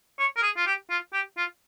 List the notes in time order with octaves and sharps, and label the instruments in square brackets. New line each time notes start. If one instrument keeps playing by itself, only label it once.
[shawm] C#5
A#4
G#4
F4
G4
F4
G4
F4